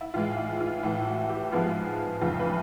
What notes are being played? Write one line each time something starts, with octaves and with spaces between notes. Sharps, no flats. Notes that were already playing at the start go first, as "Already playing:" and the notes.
E4
A2 E3 G#3 F4
E4
F4
A2 E3 A3 E4
F#4
G4
G#2 F3 G#3 B3 F4
F2 C#3 E3 A3 F4
B4